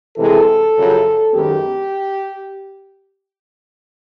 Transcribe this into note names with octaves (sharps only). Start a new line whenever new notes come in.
C3 E3 G#3 A4
F#2 C#3 F3
F#2 D#3 G#3 B3 G4